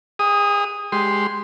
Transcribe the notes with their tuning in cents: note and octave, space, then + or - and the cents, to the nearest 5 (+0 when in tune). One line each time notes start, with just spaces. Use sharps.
G#4 -40 D#6 +0
G#3 +0 G4 +0 C6 +0